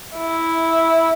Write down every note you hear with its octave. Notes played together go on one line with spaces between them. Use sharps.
E4